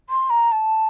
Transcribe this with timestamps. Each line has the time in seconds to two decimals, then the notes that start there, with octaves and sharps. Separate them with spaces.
0.10 C6
0.30 A#5
0.52 A5